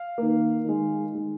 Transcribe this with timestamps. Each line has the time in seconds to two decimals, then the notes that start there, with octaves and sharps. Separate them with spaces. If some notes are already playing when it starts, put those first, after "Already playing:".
Already playing: F5
0.18 D#3 A#3
0.65 D#3 G#3
1.12 D#3 G#3